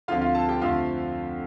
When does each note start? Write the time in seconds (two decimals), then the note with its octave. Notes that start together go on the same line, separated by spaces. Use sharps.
0.08 D2 D3 F3 C4 F4 F5
0.21 F4 F5
0.35 A4 A5
0.48 G4 G5
0.61 F2 D3 F3 A3 C4 F4 F5